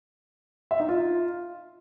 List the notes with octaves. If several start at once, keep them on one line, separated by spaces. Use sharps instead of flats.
E5
D#4
F4